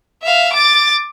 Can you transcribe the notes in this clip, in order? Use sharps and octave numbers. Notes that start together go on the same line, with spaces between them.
E5 F5
D6 A6